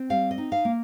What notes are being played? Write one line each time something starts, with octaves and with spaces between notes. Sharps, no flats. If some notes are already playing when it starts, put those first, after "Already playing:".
Already playing: C4
G3 F5
D#5
D#4
F5
A#3